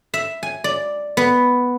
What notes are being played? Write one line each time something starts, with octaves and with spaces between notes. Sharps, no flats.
E5
G#5
D5
B3